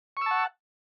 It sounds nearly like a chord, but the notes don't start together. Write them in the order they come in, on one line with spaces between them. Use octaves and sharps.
C#6 E6 A5 F#5